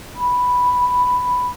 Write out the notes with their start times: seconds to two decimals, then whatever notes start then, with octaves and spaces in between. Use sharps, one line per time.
0.16 B5